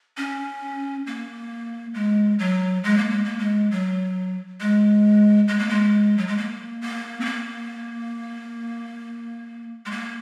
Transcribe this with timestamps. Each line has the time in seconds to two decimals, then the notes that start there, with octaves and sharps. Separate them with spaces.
0.17 C#4
1.07 A#3
1.94 G#3
2.39 F#3
2.84 G#3
2.97 A#3
3.10 G#3
3.25 A#3
3.39 G#3
3.71 F#3
4.61 G#3
5.48 G#3
5.59 A#3
5.69 G#3
6.18 F#3
6.27 G#3
6.37 A#3
6.81 A#3
7.21 C4
7.25 A#3
9.86 G#3
9.91 A#3